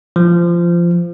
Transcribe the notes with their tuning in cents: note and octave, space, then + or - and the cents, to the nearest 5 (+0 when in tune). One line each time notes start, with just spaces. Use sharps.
F3 -20